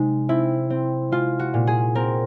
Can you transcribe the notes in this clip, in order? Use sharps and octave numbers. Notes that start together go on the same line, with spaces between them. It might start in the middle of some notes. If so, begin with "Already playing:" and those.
Already playing: C3 G#3 D#4
C4 E4
C4
G#3 F4
F#4
A#2
G#4
C4 A#4